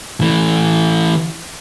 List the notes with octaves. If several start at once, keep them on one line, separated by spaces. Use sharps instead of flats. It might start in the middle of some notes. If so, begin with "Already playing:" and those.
E3 A3